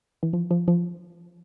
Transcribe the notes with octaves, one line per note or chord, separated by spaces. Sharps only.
E3
F3
F3
F3